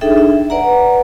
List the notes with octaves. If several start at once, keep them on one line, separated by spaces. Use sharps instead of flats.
D4 D#4 G#4 A4 E5 G5
E5
B4 D5 F#5 A#5